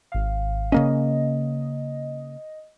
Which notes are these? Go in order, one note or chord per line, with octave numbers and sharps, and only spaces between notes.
G#1 F5
C#3 A#3 C#4 D#5